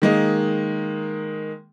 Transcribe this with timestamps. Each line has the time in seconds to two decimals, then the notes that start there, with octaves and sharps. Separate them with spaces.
0.02 D#3 G#3 A#3